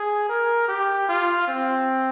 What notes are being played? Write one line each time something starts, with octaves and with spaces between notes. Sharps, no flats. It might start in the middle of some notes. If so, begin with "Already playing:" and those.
Already playing: G#4
A#4
G4
F4
C4